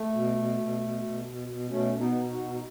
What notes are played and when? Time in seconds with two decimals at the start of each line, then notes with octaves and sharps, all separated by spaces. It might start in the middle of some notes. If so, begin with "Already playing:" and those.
Already playing: A3
0.13 B2
0.36 B2
0.58 B2
0.80 B2
1.02 B2
1.25 B2
1.48 B2
1.70 B2 A3 C#4
1.93 B2
2.00 B3 D#4
2.15 B2
2.30 D#4 F#4
2.38 B2
2.51 D#4